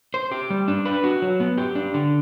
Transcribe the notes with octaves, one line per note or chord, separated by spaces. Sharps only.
C5
G4
G3
D4
B4
F#4
F#3
B3
G4
D4
D3